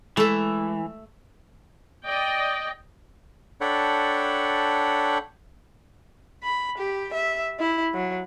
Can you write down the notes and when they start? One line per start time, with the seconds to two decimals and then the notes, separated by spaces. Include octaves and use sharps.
0.17 E3 G#3 A3 E5
2.07 D5 D#5 G5
3.61 D4 A4 C#5 F#5 G5 B5
6.43 B5
6.78 G4
7.14 E5
7.60 E4
7.94 F#3